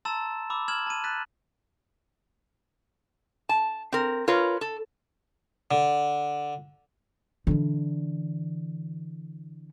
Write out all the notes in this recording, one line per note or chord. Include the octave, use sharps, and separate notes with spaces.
A5 A#5 C6 E6 A6 E7
B5 D6 E6
F6 G#6 E7 F#7
A5 D#7
F#6 A6 B6 D#7
A5
C4 A#4
F4 A#4 B4 C#5
A4
D3
D3 E3